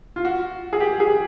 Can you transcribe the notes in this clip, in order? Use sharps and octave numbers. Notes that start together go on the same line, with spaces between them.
F4
F#4
G#4
G4
G#4